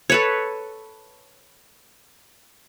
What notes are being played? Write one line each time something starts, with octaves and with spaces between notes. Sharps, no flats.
A4 B4 C#5